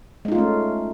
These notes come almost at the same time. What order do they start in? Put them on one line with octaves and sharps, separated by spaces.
G#3 D#4 F4 A3 C#4